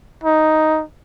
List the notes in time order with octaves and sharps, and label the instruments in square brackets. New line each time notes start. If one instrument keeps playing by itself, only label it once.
[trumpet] D#4